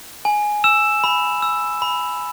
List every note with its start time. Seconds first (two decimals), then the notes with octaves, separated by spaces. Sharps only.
0.25 G#5
0.64 E6 E7
1.04 B5
1.42 E6
1.82 B5